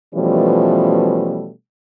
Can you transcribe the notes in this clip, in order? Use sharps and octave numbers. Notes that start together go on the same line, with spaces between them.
B2 E3 F3 G3 A3 C#4